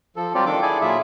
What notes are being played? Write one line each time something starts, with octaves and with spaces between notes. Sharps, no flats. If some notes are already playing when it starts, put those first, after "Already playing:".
F3 A4
F#3 G3 C4 F4 G4 D5
D#3 D4 A4 D6
E4 G#4 A4 D5 G#5
A#2 F#3 E4 F4 G#4 E5